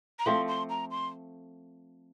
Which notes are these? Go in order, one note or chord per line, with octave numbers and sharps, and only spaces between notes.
A#5
F3 A3 C4 C6
C6
A#5
C6